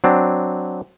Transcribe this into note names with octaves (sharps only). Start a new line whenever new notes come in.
F#3 C4 D4